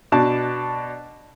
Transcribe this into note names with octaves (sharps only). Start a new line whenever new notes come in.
B2 D4 A5